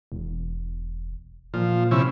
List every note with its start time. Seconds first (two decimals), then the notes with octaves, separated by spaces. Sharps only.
0.12 E1
1.54 A#2 F3
1.91 C3 C#4 E4